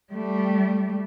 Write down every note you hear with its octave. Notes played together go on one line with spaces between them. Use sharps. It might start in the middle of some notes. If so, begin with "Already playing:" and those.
G3 A3